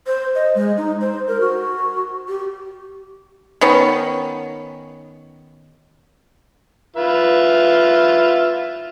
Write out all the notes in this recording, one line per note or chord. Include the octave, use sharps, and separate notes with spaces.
C5
D#5
G#3
D#4
C5
A#4
F#4
G4
D#3 B3 C#4
F4 B4 E5